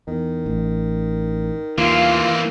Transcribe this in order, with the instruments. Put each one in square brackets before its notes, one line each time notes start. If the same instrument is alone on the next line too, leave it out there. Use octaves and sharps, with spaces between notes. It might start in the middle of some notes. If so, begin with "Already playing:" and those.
[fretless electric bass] E2 [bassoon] D#3
[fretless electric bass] A1
[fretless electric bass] D#2 [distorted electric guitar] E3 A#3 [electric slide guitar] F4